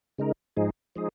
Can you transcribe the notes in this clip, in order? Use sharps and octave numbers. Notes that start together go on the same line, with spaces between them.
C#3 G#3 D#4 A#4
G#2 F3 G#3 D#4 G#4
F3 G#3 D#4 G#4